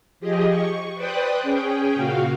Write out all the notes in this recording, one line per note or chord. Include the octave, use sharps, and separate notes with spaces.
F3 G4 G#4 D#5
C#6
B4 C5 D5 G5 D#6 F#6
C#4 G#4 G5
A#2 C#3 F#4 F5